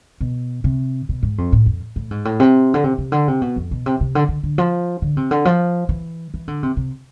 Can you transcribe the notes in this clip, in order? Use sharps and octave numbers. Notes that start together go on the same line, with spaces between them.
B2
C3
B2
G#2
F2
A2
F2
A2
G#2
A2
C3
D3
C3
C3
D3
C3
B2
F2
B2
C3
C3
D3
D3
D3
F3
D3
C3
D3
F3
E3
E3
D3
C3
C3